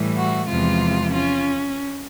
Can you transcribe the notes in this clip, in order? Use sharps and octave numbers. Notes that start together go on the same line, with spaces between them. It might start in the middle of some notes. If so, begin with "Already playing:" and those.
Already playing: A2 E3 G3
F#4
E2 C3 F3 G#3 F4
C#4 F4